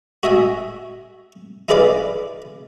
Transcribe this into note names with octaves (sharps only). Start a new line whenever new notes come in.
F#4 D#5 E5 G#5
D#4 E4 G#4 B4 D5 F5